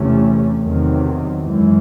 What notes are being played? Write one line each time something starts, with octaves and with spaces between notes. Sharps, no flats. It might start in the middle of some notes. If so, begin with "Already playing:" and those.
Already playing: E2 C3 E3 A3 C#4
E2 C3 D#3 F#3
F#2 E3 G#3